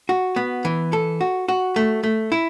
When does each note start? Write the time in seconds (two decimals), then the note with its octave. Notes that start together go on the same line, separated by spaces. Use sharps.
0.09 F#4
0.36 B3
0.65 E3
0.93 A4
1.21 F#4
1.48 F#4
1.76 A3
2.03 A3
2.32 E4